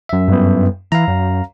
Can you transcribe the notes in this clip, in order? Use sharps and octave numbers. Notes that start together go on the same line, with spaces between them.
F#2 E5
G2 B3
E3 F5 A#5
F#2